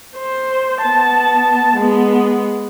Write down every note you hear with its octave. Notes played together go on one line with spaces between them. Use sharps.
C5
B3 A5
G#3 B3